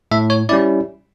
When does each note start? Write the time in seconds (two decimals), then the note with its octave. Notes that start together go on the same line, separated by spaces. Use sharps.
0.11 A2 E5
0.30 C#5
0.49 G3 C#4 E4 D5